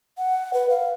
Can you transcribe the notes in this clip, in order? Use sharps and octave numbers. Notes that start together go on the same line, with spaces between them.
F#5
B4
F5